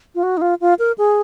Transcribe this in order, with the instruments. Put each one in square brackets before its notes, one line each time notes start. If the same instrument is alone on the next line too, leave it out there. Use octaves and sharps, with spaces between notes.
[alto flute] F4
F#4
D#4
F4
F4
A#4
G#4